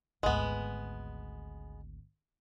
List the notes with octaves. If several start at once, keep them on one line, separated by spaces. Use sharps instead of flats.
G#1 D2 G#3 B3